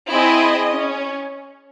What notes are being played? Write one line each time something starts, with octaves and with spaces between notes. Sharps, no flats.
C4 E4 G#4 D#5
C#4